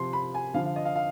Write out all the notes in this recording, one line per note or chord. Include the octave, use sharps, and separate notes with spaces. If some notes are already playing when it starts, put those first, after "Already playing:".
Already playing: C3 F3 C6
B5
G#5
D3 F3 F5
F5
D#5
F5
F5